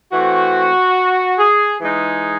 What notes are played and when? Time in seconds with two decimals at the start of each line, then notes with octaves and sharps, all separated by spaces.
0.13 E3 A3 C4 F#4
1.38 G#4
1.80 E3 G#3 D#4 G#4